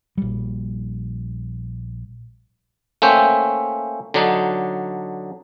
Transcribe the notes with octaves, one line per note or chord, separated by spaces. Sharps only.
A#1 G3
A3 A#3 C#4 C5 E5 G5
D3 F#3 D4 D#4